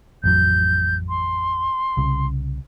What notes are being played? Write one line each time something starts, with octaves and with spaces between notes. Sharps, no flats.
A1 F2 F#3 G6
C6
C2 C#3